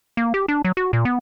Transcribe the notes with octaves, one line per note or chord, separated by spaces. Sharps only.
A#3
G4
D4
F#3
F#4
A#2
B3